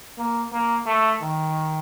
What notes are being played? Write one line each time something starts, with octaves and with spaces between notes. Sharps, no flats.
A#3
A#3
A3
D#3